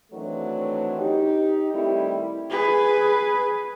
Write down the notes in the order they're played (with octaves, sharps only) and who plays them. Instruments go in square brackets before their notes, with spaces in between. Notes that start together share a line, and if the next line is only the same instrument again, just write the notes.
[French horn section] D#3 E3 F#3 A3 C4 D4
D#4 G4
D#3 G3 A3 C4 E4
[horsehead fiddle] G#4 B4